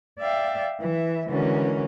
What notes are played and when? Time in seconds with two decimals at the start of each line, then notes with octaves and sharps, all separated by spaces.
0.19 D5 E5 F5 G5
0.80 E3 E5
1.28 D3 E3 G#3 C#4 F#4 A#4